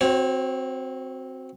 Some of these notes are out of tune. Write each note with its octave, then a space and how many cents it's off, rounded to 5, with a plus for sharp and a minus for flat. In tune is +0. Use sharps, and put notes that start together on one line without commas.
C4 +0 F#4 +0 C#5 -35